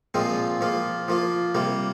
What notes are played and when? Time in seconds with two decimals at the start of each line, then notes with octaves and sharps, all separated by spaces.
0.14 A#2 F3 G#3 C4 F4
0.61 F3 A#3 F4
1.08 F3 A#3 F4
1.55 C3 G3 A#3